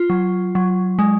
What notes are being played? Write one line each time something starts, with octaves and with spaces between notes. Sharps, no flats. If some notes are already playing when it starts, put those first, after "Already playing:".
Already playing: F4
F#3
F#3
G#3